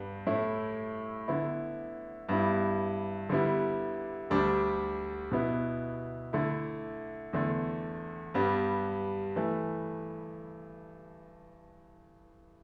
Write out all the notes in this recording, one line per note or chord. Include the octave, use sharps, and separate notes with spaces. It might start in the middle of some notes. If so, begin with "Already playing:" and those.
Already playing: G2 G3 B3
A2 A3 E4
D3 B3 E4
G2 G3 B3 E4
D3 G3 B3 E4
D2 D3 G3 D4
B2 B3 E4
D3 A3 E4
E2 D3 A3
G2 G3 B3
E3 A3